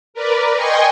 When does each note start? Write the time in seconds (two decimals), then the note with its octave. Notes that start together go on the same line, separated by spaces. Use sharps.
0.14 A#4 B4 D5
0.55 D#5 G5 G#5 C6 C#6